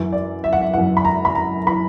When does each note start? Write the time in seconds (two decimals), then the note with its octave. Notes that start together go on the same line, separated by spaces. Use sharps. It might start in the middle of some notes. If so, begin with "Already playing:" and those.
Already playing: F#2 E3
0.12 D5
0.44 E5
0.53 F#5
0.61 E5
0.74 F#2 E3 F#5
0.97 B5
1.05 A#5
1.25 B5
1.35 A#5
1.66 E3 B5